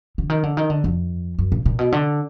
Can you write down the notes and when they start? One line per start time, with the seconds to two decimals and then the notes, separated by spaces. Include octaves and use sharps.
0.18 D3
0.30 D#3
0.43 D3
0.57 D#3
0.70 D3
0.84 F2
1.38 F#2
1.52 A#2
1.66 A#2
1.79 B2
1.92 D3